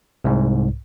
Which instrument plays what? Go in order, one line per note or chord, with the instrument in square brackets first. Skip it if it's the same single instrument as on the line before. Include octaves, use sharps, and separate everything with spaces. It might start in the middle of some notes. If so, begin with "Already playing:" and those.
[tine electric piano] C2 G#2